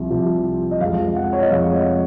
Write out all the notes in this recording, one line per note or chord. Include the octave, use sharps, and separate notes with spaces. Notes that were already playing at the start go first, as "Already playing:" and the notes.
Already playing: C2 C3 F3
C2 C3 F3
D#5
F2 C3 F3 G#3 F5
F#5
C#5
D#5
F2 C3 F3 G#3 F5
D#5